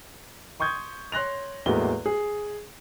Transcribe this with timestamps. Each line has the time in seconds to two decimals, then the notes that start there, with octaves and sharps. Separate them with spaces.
0.60 C6 C#6 D#6 G6 G#6
1.12 C#5 C6 F#6 A#6 F7
1.66 E2 A2 G#3 A#3 F#4 G7
2.06 G#4